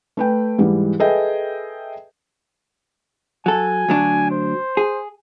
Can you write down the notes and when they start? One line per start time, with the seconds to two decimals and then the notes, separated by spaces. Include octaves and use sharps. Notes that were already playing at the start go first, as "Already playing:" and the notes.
0.17 A3 B4 G5
0.59 G#2 E3 G3 G#3
1.00 G#4 A4 B4 D#5 E5 G5
3.46 F#3 A4 G#5
3.88 D2 F#3 D4
4.31 C5
4.77 G#4